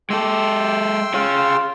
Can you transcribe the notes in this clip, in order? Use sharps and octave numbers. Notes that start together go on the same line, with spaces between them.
G#3 G4 A4 G5 C6 E6
F4 G#4 C#5